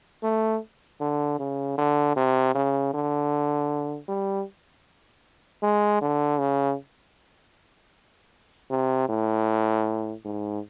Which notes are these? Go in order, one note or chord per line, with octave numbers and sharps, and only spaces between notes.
A3
D3
C#3
D3
C3
C#3
D3
G3
G#3
D3
C#3
C3
A2
G#2